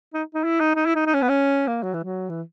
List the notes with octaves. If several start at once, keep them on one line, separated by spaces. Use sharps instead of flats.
D#4
D#4
E4
D#4
D#4
E4
D#4
D#4
C#4
B3
C#4
A#3
F#3
E3
F#3
E3